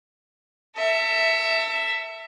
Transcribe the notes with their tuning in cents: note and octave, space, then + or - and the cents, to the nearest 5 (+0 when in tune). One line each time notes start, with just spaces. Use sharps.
A4 +35 E5 +0